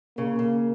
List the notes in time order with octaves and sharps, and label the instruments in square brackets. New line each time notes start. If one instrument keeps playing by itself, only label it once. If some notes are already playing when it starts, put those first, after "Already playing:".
[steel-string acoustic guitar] C#3 [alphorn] A#3
[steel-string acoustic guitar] C#3